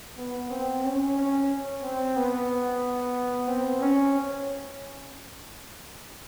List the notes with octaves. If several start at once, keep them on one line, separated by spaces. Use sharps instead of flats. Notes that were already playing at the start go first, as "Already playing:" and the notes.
B3
C4
C#4
C#4
C4
B3
C4
C#4